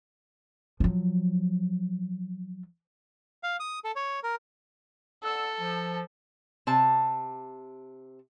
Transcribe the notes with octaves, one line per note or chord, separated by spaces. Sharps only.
F3 F#3
F5
D#6
A4
C#5
A#4
A4 D5 F#5 E6
F3
C3 A5